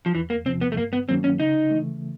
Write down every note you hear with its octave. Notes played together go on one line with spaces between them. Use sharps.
F3
E2 E3
A#3
C3 F3 C4
B3
A3
G2 A#3
B3
D#3 F#3 A#3 C4 C#4
C#4
C#3 D#4
E3 A3